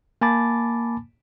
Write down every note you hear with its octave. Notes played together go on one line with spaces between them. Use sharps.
A#3 G#5 A5 B5 D6 A6